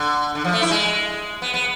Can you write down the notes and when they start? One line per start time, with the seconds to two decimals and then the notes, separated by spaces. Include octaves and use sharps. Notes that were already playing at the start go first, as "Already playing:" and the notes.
Already playing: D3
0.35 D3
0.44 F3
0.53 A3
0.62 E4
0.71 G#3
1.42 B3
1.54 B3